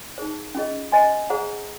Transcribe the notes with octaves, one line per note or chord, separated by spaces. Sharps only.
D#4 G#4 C5
C#4 F4 G#4 D#5
C5 D#5 G#5 C6
G#4 C5 F#5 A#5